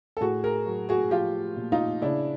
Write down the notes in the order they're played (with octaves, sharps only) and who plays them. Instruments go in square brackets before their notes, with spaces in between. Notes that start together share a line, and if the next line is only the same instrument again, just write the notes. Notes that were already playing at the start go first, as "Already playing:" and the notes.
[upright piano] A4
A2 F#4 G#4
G#4 A#4
F#3
F#4 G#4
F3 F4 G4
A#2
D#4 F4
C#3 D4 E4